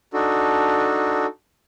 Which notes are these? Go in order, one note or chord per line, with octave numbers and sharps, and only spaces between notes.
D4 D#4 F#4 A4